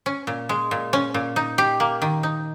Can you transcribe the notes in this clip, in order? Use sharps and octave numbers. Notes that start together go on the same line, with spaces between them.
C#4
A#2
G#3
A#2
C#4
A#2
D#4
G4
A#3
D#3
D#4